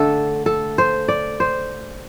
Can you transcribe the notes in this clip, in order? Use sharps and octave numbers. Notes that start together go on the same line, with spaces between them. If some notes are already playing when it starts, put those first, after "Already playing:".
Already playing: D3 A3 A4
A4
C5
D5
C5